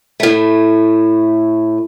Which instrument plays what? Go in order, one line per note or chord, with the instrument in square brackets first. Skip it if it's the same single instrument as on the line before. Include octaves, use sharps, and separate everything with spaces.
[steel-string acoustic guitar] A2 A3